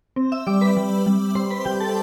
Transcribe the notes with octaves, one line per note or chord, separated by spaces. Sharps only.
C4
E5 E6
G3 D5 D6
B4 B5
G3
G3
G3 C5 C6
B4 B5
G3 G4 G5
A4 A5